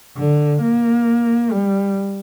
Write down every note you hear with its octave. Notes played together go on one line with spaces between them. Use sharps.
D3
A#3
G3